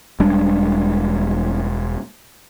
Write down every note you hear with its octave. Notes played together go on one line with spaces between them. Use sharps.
E1 G3 G#3 D4